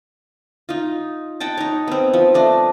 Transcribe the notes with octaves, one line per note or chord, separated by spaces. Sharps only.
D#4 F4
D#5 F#5 G5 A5
D#4 C#5
B3 C4
F3
A3 D4 D#5